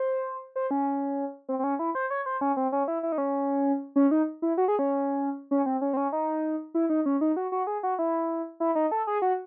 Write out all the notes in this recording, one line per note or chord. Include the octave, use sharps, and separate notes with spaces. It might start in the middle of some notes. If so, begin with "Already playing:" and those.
Already playing: C5
C5
C#4
C4
C4
C#4
E4
C5
C#5
C5
C#4
C4
C#4
E4
E4
D#4
C#4
C#4
D#4
E4
F#4
G#4
C#4
C#4
C4
C#4
C4
C#4
D#4
E4
D#4
C#4
D#4
F#4
F#4
G#4
F#4
E4
E4
D#4
A4
G#4
F#4